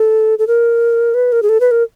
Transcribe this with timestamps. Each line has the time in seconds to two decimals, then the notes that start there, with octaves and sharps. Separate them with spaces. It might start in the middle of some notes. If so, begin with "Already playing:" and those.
Already playing: A4
0.39 A4
0.47 A#4
1.14 B4
1.32 A#4
1.43 G#4
1.49 A4
1.60 B4
1.71 A#4